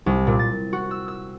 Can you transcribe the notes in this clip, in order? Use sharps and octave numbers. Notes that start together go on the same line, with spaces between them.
C2
A#2
A6
F#4
E6
E6